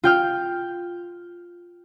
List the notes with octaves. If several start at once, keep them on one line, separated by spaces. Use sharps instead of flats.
F4 G5 F6